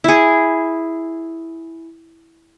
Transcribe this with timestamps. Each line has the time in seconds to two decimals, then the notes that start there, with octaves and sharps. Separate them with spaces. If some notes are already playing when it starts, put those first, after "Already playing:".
0.04 E4 G#4